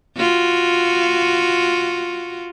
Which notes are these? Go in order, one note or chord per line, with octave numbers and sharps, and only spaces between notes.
F4 F#4